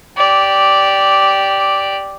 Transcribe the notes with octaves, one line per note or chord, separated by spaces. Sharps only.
G4 D5